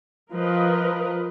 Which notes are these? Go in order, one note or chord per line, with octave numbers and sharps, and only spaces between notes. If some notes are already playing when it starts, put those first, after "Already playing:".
F3 A#4 B4 D#5